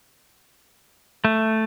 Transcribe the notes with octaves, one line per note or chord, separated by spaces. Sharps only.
A3